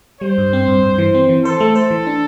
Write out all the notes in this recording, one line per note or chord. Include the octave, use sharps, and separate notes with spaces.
G3 C5
G2
C4
G2
G2
E3
C4
E3
A4 C5
A3
C5
E3
D4